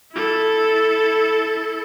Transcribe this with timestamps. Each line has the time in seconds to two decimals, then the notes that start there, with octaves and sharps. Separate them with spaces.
0.13 E4 A4